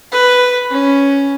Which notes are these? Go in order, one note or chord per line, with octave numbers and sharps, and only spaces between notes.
B4
C#4